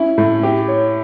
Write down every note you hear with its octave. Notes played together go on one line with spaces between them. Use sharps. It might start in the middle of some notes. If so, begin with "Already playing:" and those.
Already playing: C#4 E4
A2
G4
C#5